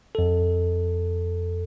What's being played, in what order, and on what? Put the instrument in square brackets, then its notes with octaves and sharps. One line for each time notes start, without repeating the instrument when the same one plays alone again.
[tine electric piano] F2 A4